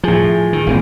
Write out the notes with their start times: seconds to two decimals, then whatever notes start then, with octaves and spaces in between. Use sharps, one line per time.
0.04 A2 F3 G#4
0.53 D#3
0.67 G#1 A#2 E3 C4